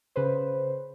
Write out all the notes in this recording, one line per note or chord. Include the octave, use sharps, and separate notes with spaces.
C#3 B4 C5